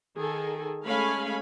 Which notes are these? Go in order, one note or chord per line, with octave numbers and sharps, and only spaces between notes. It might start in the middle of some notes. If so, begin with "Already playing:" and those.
D#3 G#4 A4
G#3 A3 C#4 F5 G#5 B5